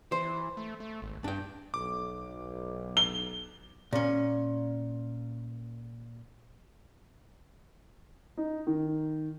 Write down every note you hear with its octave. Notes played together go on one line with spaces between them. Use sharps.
E3 C5
A3
A3
G#1
G2 D4 G5
B1 D6
G7
A#2 C#4
D#4
D#3